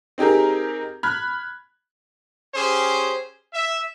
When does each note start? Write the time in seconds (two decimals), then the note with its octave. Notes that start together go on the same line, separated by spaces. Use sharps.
0.18 C4 D#4 G4 G#4 A#4
1.03 B5 F6 F#6 G#6
2.55 C#4 G4 G#4 C5
3.53 E5